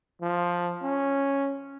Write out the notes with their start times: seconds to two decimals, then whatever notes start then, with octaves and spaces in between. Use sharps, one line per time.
0.21 F3
0.83 C#4